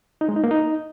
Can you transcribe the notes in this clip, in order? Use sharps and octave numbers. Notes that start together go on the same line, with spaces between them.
D#4
G#3
D#4
A#3
D#4